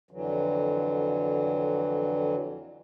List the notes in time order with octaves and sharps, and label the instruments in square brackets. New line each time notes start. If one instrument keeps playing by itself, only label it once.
[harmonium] F2 D3 E3 F#3